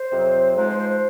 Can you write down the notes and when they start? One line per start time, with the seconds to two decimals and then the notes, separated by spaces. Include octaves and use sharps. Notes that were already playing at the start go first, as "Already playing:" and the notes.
Already playing: C5
0.12 F2 C3 F#3
0.55 G#2 F3 G#3 C5
0.67 C5
0.78 C5
0.89 C5